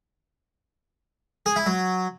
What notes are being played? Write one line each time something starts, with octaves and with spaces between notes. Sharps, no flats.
G#4
E4
F#3